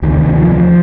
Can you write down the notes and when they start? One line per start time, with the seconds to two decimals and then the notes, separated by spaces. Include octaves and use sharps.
0.02 D2 C3 D#3
0.19 D#3
0.35 F3
0.51 F3